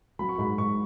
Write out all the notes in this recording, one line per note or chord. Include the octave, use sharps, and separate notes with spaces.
F#3 B5
C#6
G#2 B5
G#2 C#6